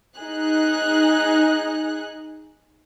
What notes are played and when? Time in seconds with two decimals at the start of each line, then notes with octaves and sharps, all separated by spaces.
0.18 D#4 G#4 F#6